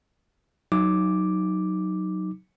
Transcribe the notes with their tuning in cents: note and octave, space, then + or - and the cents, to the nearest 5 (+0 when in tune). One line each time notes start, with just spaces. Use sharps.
F#3 +0 D#4 +0 D6 +0